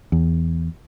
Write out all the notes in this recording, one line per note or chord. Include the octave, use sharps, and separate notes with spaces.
E2